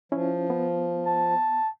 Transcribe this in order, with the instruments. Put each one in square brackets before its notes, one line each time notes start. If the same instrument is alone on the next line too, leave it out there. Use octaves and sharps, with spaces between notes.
[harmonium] F3 [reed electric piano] C#4 E4
[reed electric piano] B3
[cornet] A5